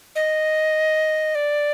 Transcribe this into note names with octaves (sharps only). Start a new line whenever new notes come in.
D#5
D5